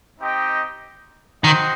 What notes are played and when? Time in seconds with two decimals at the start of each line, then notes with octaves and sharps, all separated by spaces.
0.19 C4 D#4 G4 D#5 G5
1.43 D#3 C4 F#4 C5 D#5 G5